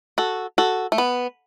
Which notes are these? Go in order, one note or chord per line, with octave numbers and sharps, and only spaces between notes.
F#4 A4
F#4 A4
A3
B3